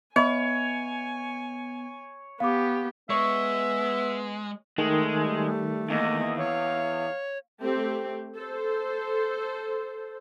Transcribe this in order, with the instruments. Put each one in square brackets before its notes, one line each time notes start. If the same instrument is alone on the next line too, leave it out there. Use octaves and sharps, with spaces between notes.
[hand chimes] B3 [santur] C#5 [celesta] D#5 E5 B5 [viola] G#5
[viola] B3 G4 [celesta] F5 D6
[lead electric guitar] G#3 [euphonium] B3 [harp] C#5 C#6 [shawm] E5
[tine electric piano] D#3 [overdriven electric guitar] G#3 [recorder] A3
[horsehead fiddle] G3
[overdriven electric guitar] E2 [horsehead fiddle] A#3 D#5
[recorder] C#5 [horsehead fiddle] F5
[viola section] A3 C4 G4
A4 C5